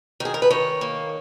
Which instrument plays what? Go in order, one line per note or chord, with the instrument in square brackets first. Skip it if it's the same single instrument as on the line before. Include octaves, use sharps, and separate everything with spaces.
[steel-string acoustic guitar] D#3 G#4
A#4
B4
D#3 C#5
A#3